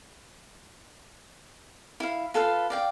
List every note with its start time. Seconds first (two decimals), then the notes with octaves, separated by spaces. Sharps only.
2.00 E4 F5
2.34 F4 A4 B4 F5
2.70 D5 F5 G5